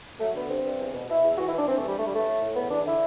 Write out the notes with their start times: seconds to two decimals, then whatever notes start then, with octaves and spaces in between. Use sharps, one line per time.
0.19 F#3 A3
0.35 D3 B3
0.49 G2 C4
0.64 G2
0.79 E2
0.93 B2
1.08 B2 E4
1.23 E2
1.37 E3 F#4
1.48 E4
1.53 E3 D4
1.67 E3 C4
1.77 A3
1.83 G2 G3
1.97 E3 A3
2.06 G3
2.12 A2 A3
2.27 A2
2.42 A2
2.56 E2 B3
2.70 E2 D4
2.86 D3 E4